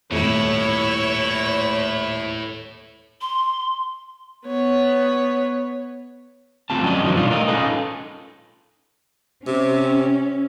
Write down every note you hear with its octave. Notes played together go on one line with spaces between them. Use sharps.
D#1 G#1 A2 A3 E4 B4 C#5
C6
B3 C#5
D2 C4 F4 G4 A5
F#3 C#4 F#4 D5 D#5
F#2 D3 D#3 F3 F#3
B2 E3 G3 B3 D4 F4
A3 A#4 D#5
C#4 D#4 F4 G#4 A4 B4
C3 C#4